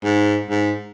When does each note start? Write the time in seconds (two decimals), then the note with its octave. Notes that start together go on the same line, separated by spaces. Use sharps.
0.04 G#2
0.50 G#2